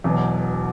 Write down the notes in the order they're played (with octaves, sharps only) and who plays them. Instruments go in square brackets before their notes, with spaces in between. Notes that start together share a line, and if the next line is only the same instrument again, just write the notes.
[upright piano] E1 E2 B2 F#3